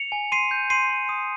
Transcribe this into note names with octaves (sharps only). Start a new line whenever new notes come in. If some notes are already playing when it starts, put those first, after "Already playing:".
Already playing: C#7 F7
G#5
C6 C7 D#7
G6
C6 C7 D#7
C6
D#6